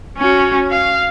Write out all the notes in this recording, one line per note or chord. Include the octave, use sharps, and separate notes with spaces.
C#4 F#4
F5